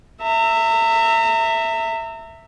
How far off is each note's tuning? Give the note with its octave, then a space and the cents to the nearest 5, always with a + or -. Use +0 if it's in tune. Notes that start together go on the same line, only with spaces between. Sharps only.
E5 +0 A#5 -35